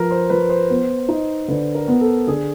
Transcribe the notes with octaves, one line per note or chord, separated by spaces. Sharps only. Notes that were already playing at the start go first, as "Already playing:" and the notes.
Already playing: F3 A#4 B4
C5
F3 B4
C5
B3
D#4
D3 B4
A#4
B3
A4
D3 G#4